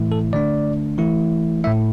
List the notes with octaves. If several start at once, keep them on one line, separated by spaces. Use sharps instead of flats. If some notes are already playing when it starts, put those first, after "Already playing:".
Already playing: A2 E3 A3 E4
A4
D3 A3 D4 D5
E3 A3 E4
A2 A3 E4 E5